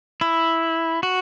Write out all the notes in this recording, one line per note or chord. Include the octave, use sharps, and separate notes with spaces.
E4
F#4